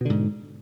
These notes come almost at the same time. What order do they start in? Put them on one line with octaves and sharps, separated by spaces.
B2 D3 G#2